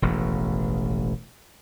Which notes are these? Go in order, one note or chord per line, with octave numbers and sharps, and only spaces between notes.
E1 A1 D#2